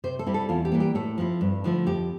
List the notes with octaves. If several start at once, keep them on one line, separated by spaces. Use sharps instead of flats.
C3 C5
A4
G3 C4 E4
A4
E2 F4
G4
E3 G3 A#3
G4
A2 A4
F3 C4 E4
G2
D3 F3 A3 E4
F2 G4